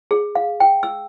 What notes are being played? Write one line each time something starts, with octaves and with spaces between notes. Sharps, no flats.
G#4
F5
G5
E6